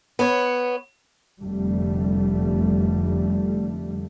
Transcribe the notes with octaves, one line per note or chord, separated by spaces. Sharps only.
B3 C#5
F1 F2 D3 G3 A3